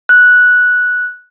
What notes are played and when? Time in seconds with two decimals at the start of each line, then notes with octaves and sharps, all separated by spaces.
0.09 F#6